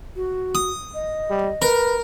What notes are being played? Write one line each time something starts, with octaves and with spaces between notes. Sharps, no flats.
F#4
D#6
D#5
G3
A#4 B4